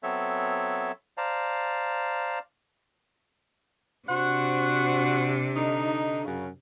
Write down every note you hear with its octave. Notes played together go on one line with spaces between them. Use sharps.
F#3 B3 C4 A4 C#5 E5
C5 D5 F5 A5 A#5
C3 D4 F#4 C5 F#5
D3 D#4
F#2 C#3